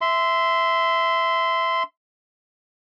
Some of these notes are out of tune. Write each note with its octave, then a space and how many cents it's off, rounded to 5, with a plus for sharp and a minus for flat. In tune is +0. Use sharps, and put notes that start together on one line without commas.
E5 +0 C6 -20